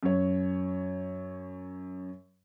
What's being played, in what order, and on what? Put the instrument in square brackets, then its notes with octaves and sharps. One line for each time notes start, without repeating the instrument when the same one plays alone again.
[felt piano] F#2 C#5